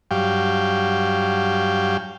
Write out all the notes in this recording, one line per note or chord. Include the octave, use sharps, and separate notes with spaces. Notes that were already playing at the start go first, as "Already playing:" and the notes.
G2 F#3 G4 F5 G5